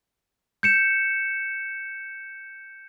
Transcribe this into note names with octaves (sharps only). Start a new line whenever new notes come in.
G6 C#7 E7